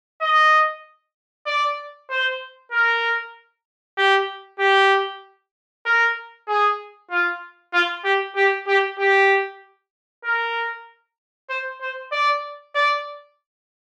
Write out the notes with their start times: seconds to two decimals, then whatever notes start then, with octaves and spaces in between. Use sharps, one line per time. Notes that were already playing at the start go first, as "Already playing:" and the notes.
0.21 D#5
1.46 D5
2.10 C5
2.72 A#4
3.97 G4
4.60 G4
5.85 A#4
6.48 G#4
7.10 F4
7.73 F4
8.04 G4
8.36 G4
8.68 G4
8.99 G4
10.24 A#4
11.49 C5
11.81 C5
12.12 D5
12.75 D5